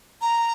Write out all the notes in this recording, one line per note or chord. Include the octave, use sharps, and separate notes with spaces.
A#5